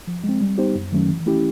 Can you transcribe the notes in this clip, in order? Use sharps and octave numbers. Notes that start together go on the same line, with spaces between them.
F3
G#3 C4
G3
B3 D#4 G4 C5
F#2
D#3 F#3 A3 C#4
E3
A3 C#4 E4 G4